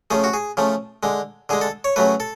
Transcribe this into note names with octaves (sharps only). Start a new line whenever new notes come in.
C#3 F3 A3 G#4
F#4
G#4
C#3 F3 A3
D3 G#3
D3 G#3 G#4
A4
C#5
C#3 F#3 A3 B4
A4